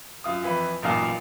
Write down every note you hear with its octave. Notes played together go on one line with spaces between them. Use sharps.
F#2 F4 D#6
F2 E3 B4
A1 F#2 A#2 D#4 F5 A5